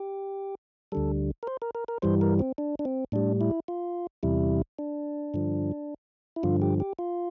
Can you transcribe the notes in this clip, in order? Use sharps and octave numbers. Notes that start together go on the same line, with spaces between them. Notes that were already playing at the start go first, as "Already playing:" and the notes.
Already playing: G4
D2 D3 G3 A4
A#4
C5
A#4
A#4
A#4
G2 E3 G3 C5
A#4
C4
D4
D4
C4
A2 G3 D4
E4
F4
E2 C3 G3 E4
D4
G2 D3 F3
E4
G2 D3 F3 F4
G4
G4
F4